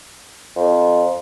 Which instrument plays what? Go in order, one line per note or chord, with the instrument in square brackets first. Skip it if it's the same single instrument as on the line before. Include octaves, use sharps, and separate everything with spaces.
[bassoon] F2